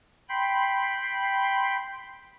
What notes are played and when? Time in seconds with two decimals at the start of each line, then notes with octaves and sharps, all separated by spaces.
0.29 G5 B5 C6